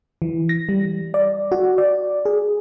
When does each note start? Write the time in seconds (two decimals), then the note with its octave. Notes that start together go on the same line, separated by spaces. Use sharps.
0.22 E3
0.49 A#6
0.69 G3
1.14 D5
1.52 F#4
1.78 D5
2.25 G#4